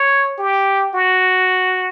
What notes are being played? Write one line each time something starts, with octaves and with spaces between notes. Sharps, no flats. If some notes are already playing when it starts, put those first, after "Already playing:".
Already playing: C#5
G4
F#4